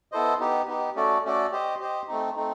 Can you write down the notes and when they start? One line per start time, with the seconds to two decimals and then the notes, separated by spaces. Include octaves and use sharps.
0.12 B3 E4 A4 C5 D#5
0.40 B3 D#4 G4
0.67 B3 D#4 G4
0.96 A3 C#4 F#4 A4 D5
1.24 A3 C#4 F#4 A4 D5
1.52 G4 C5 D#5
1.80 G4 C5 D#5
2.08 A3 C4 D#4
2.36 A3 C4 D#4